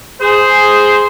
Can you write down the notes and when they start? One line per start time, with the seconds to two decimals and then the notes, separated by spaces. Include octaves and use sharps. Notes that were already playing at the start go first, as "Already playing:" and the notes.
0.21 G#4 C5